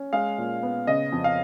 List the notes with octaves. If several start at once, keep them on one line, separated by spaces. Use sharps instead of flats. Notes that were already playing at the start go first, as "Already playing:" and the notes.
Already playing: C#4
G#3 F5
A#2
B3
C#3 D#5
F2
F5